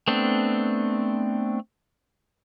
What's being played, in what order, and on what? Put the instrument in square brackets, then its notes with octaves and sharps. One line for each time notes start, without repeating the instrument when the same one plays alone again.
[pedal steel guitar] A3 B3 C4 D4